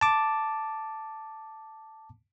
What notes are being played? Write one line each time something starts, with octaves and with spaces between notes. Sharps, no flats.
A5 D6